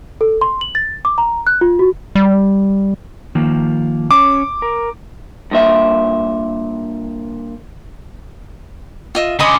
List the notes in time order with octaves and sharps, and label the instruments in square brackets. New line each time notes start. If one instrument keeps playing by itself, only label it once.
[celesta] A4
C6
F#7
A6
D6
A#5
F#6
F4
F#4
[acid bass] G3
[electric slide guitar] D#3 F3 A#3
[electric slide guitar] C#4 C#5 [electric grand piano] D6
[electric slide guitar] A#4
[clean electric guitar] G2 A#2 E5
[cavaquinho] F4 D#5 E5
[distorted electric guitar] D3 C#4 [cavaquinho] D#5 B5 D#6 [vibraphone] G#5 C6 D6